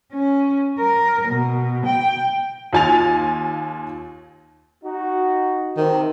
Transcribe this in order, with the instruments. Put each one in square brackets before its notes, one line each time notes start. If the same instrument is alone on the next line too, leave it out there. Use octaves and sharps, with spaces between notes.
[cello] C#4
A#4
B2
G5
[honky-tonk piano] D#2 F4 G#5 A6 F7
[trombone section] D#4 F#4
[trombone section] C3 [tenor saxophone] D#3